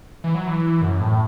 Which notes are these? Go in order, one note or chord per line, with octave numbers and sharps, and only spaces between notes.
E3
F#3
E3
F#2
A2